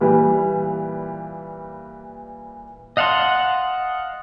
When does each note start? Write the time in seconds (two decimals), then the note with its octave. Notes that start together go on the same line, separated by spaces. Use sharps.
0.01 A#2 E3 G3 B4
2.97 D#5 F5 F#5 A5 C6